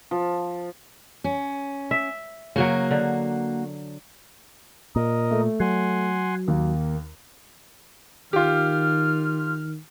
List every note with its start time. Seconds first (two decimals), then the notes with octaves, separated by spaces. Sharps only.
0.11 F3
1.24 C#4
1.91 E5
2.56 C#3 F#3 A#3 F#4
2.91 D3
4.96 A#2 A#4 D#5
5.31 A3
5.60 F#3 F#5 G#5 C6
6.48 D#2 A#3
8.33 D#3 F4 G4 F6